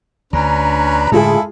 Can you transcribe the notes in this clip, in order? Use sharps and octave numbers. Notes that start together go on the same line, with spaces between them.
D2 D3 C#4 D4 B4 A#5
A2 D3 G#3 E4 F4 G#4 A4